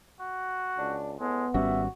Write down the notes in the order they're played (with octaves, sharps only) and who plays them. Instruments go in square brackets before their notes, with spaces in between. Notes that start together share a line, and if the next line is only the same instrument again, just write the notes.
[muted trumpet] F#4
[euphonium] C#2 [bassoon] D4
[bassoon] A2 [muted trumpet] G#3 [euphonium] B3
[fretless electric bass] G#1 G3 C#4 [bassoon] F#4 [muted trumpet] E5